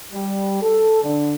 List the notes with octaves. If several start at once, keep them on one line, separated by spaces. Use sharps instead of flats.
G3
A4
D3